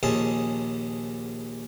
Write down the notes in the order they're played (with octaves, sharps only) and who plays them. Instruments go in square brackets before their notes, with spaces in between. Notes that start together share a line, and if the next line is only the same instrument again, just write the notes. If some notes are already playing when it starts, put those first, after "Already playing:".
[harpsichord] A#1 D#2 C#4 G#4 A5